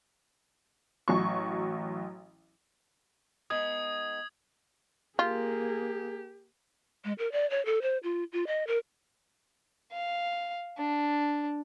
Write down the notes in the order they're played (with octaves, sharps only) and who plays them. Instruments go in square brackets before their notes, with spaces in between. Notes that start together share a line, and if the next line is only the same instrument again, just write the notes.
[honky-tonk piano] A1 F#3 C#6
[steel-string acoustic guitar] G#3 B3 D#4 [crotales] D#6 G#6 F#7
[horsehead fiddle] A#3 G#4 [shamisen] F4 [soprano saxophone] G4
[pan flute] G#3
A#4
D5
C#5
A4
C5
F4
F4
D#5
A#4
[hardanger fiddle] F5
D4